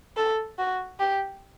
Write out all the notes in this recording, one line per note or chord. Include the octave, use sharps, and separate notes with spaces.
A4
F#4
G4